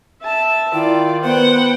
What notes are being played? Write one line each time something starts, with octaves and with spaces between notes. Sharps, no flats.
E5 A5
D#3 E4 F4 D5
B3 C5 F#5 G5